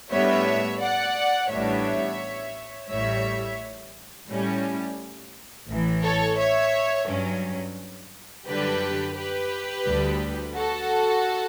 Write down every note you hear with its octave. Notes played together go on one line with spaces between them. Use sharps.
A2 G3 B3 D4 C#5 E5
D5 F#5
A1 A2 G3 B3 D4 C#5 E5
A1 A2 G3 C#5 E5
A2 G3 C#4
A1 A2 E3
A4 C#5
C#5 E5
G2 F#3 C#4
F#2 D3 G3 D4 G4 B4
G4 B4
D2 D3 G3
F#4 A4